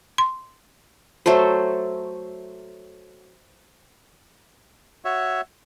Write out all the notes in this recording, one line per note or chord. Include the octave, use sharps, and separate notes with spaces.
C6
F#3 A3 A4 C5
F#4 C#5 E5